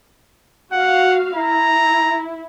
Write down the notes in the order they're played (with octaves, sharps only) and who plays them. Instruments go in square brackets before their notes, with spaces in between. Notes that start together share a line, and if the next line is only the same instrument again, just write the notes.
[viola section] F#4 F5 [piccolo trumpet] F#5
[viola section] E4 [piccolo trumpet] A#5